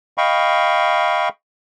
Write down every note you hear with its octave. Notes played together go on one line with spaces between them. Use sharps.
D#5 F5 G5 B5 C#6